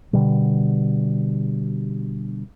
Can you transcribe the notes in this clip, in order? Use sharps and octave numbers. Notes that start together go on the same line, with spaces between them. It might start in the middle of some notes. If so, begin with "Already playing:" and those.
B2 D3 G3